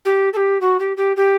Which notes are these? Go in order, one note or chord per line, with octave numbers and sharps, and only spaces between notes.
G4
A4
G4
F#4
G4
G4
G4